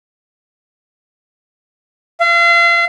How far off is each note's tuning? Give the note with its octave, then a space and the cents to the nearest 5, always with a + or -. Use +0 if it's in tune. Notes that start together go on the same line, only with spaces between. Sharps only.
F5 -35